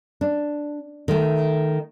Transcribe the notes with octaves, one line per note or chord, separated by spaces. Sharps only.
D4
D#3 A3